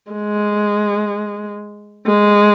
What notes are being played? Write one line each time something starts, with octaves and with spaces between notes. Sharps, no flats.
G#3
G#3